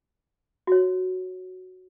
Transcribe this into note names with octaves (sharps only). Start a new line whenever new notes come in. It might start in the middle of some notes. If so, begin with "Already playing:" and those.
F#4 C#5